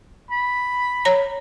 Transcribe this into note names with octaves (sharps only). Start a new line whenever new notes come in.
B5
C#5 A#5